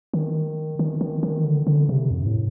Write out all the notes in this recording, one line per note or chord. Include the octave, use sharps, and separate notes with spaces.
D#3
D#3
D#3
D#3
D3
D3
C3
F2
G2
A2